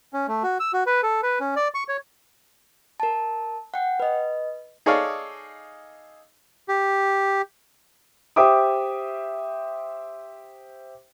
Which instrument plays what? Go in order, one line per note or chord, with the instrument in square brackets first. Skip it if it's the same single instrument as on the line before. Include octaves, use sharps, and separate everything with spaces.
[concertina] C#4
A3
F#4
E6
F#4
B4
A4
B4
C#4
D5
C#6
C#5
[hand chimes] A#4 A5
F#5 G5
B4 D#5
[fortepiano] D#4 G#4 A4 C#5 D5 F5
[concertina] G4
[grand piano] G4 C5 E5 G5 D6 D#6